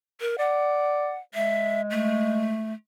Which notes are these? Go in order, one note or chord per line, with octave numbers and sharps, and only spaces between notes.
A#4
D5 F#5
G#3 E5
A3